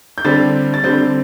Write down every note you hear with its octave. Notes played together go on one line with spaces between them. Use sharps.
G6
D3 G3 C4 A6
A6
D3 G3 C4 G6